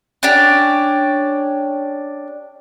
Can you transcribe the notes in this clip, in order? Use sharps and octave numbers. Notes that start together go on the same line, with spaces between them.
C#4 D4 G4